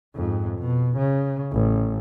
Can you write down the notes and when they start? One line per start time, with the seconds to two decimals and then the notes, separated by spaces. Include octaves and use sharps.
0.15 F2 G#2
0.59 B2
0.97 C#3
1.52 A1